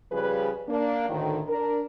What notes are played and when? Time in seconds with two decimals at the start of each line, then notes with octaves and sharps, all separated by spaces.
0.11 C#3 F3 G3 G#4 B4
0.68 A#3 D4
1.09 D2 A2 D3 D#3
1.47 D4 A#4